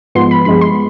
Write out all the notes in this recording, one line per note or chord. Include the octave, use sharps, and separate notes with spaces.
G#2 F3 G#3 B3 C6
B5
G2 F3 G#3 B3 B5
C6